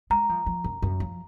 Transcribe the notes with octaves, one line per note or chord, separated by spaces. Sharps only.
G#3 A#5
F3
F3
F#2
F#2
F3